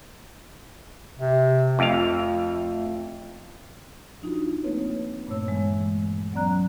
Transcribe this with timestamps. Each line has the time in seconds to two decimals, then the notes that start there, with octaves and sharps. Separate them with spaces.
1.19 C3
1.79 F2 A3 F5
4.22 F3 D4 D#4 F4 F#4
4.64 A3 A#3 C4 D#4 B4 C#5
5.27 G2 A#2 A3 C#5 E6
5.47 E3 G#3 B3
6.33 F#3 B3 C#4 D5 A#5 F#6